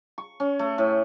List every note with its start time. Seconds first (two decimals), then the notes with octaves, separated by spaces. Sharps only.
0.18 C#6
0.40 C#4
0.59 A3
0.78 A2